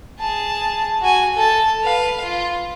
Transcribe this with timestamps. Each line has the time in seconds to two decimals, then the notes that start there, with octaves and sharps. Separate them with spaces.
0.20 G#4 A5
1.01 F#4 G#5
1.35 A4 A5
1.83 B4 F5
2.23 F4